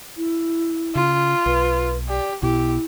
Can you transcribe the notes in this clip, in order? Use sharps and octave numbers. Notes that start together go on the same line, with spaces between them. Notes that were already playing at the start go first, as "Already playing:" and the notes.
E4
C#3 F4
B1 B4
G4 D5
B1 B2 E4 G4